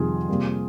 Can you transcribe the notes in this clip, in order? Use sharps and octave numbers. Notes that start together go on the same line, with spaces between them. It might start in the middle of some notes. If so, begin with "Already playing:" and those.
Already playing: F2 C3 D#3 G3 F4 G#4
C3 G3 A#3